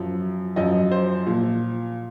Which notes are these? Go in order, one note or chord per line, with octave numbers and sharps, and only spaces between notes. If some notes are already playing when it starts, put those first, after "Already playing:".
Already playing: F#2 F3
F#2 F3 D#5
C5
A#2 F3